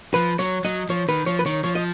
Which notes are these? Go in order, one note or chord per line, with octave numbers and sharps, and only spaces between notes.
F3 B4
F#3 C#5
F#3 D#5
F3 C#5
D#3 B4
F3 C#5
B4
D#3 C#5
F3 C#5
D#5